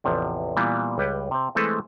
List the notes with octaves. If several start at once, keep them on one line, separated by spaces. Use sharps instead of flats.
A1 E2 C3 F3
A#2 E3 G3 A#3 B3
C#2 G3 B4 C#5 G5
C3 C4
E3 G#3 A3 C4 A4 B4